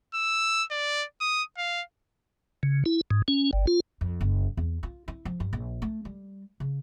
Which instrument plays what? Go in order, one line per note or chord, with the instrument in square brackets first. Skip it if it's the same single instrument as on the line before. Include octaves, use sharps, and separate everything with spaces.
[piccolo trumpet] E6
D5
D#6
F5
[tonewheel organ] C#3
E4
G#2
C#4
G1
F4
[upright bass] F2
F#1
E2
F4
E4
F3
G2
A#1
A3
G3
C#3